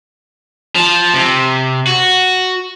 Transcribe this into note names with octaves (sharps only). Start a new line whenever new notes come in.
F3
C3
F#4